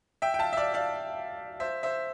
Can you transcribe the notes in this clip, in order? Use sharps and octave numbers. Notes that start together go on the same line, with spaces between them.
E5 G5
G5
F5 A5
E5
D5 F5
D5 F5
C5 E5
C5 E5